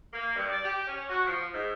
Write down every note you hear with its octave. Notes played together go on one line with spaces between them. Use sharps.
A#3
G2
D5
G4
C#4
F#4
F3
G#2